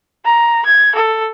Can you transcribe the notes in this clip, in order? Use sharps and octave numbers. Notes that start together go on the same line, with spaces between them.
A#5
G#6
A4